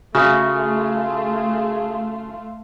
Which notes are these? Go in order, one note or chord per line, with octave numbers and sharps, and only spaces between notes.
C#3 A3 F4 F#4 G#4 E5